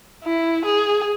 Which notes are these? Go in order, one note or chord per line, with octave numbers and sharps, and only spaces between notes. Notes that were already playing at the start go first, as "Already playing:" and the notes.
E4
G#4